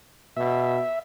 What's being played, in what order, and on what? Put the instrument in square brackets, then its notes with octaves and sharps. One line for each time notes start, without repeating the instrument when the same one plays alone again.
[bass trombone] B2 [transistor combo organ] E5